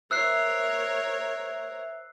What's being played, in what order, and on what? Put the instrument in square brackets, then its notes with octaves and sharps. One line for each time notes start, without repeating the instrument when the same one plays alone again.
[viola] A#4 C#5 [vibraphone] C5 E5 [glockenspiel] E6 F#6 C7